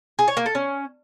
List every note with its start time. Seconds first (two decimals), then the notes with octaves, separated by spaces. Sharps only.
0.19 G#4
0.28 C#5
0.37 A#3
0.46 A4
0.55 C#4